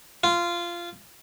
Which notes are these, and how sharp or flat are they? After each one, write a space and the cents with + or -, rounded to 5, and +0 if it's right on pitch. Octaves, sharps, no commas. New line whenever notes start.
F4 -15